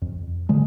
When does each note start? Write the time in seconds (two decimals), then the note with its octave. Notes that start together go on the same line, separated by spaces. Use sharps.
0.02 F2
0.49 D3 G#3